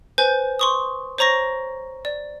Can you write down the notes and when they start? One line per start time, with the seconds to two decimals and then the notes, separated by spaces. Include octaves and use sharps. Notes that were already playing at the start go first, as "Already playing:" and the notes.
0.18 B4 C5 G#5 G6
0.59 C6 C#6 D#6
1.18 C5 C#5 A#5 C#6 A#6
2.05 D5